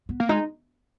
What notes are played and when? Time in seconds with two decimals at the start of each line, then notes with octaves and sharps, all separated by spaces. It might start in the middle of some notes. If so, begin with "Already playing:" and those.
0.09 B3
0.20 A#3
0.29 G#3 D#4